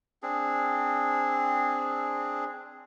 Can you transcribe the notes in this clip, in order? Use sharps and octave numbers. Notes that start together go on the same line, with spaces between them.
C4 D4 G#4